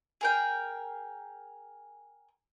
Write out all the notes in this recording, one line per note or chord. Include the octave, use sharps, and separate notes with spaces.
G#4 A#4 G5